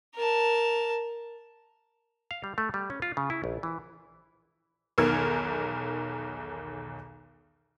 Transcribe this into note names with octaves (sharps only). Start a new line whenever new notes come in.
A#4 A5
F5
G3
A3
G3
C#4
F4
C#3
E4
A#1
E3
B1 E2 D#3 A#4 F6 G#6